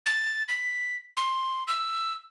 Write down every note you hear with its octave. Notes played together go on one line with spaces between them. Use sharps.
A6
B6
C6
E6